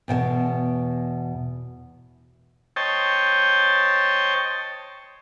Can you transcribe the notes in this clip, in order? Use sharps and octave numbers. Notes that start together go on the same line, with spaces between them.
E2 B2 G5 A5
C5 C#5 D#5 G5 A5